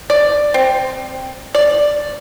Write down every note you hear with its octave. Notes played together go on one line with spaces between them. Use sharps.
D5
C4
D5